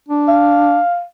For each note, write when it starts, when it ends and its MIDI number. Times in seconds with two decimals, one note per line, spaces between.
0.08 0.79 62
0.28 1.03 77